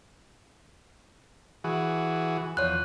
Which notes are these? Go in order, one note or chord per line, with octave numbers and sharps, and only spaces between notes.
E3 F#4 G#4
E2 F3 C#5 F#6